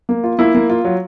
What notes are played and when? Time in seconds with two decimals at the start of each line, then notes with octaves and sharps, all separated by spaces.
0.09 A#3
0.24 F4
0.38 A#3 E4
0.55 A#3
0.70 F4
0.85 F#3